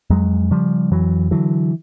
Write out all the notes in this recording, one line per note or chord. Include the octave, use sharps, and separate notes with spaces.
F2 F#3 G#3
C#3 F3 G3
F2 E3 F#3
D3 E3 F#3